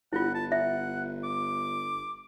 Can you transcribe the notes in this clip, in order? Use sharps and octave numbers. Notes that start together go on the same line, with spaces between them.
G1 E4 F4 F#5
A5
E5 F#5
D6